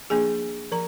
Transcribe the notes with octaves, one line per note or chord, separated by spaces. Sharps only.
F3 A#3 D4 G#4 G#5
F3 A#4 A#5